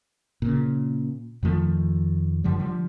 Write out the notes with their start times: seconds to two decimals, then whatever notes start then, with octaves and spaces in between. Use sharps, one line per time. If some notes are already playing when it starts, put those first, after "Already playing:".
0.42 A#2 C#3
1.43 F2 D#3 F3 A3
2.44 F#2 D3 F3 G3
2.60 D3 F3 G3